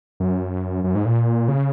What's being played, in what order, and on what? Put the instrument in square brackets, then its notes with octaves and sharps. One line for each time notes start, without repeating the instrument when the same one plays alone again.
[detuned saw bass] F#2
F#2
G#2
A#2
C#3